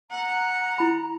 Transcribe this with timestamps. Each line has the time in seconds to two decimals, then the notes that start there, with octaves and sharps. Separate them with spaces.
0.11 F#5 A#5
0.78 E4 B5